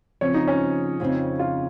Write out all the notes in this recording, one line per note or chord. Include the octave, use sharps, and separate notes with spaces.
C#3 F3 C4 C#5
D#4
C#4
F2 C#3 G#3 C4 D#4
F4